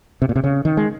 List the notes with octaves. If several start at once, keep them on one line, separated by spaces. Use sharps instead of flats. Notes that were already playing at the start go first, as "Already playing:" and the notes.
C3
A#2
C3
C#3
D#3
G#3